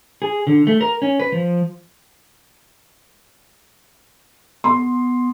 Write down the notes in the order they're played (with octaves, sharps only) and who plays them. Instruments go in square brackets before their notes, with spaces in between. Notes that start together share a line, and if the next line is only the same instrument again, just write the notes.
[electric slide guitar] G#4
D3
A3
A#4
C#4
B4
F3
[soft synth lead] B3 [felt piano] C6